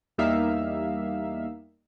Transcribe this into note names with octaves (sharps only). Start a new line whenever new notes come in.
E2 G3 A#3 D#4 E5 F5